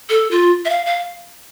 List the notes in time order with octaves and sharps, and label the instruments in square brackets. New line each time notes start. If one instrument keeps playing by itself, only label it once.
[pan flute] A4
F4
E5
F5
F5